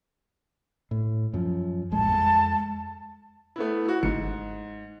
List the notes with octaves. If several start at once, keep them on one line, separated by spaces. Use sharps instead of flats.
A2
F#2 F3
D#1 A1 G#3 A5
F2 G#3
A3 B3 E4
E4 F#4
G1 G#2 C#7